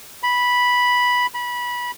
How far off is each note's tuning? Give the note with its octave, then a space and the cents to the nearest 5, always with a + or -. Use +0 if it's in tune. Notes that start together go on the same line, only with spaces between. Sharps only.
B5 -5
B5 -20